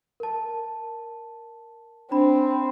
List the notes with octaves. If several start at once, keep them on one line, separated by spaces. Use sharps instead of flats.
A#4 A5
C4 D4 B5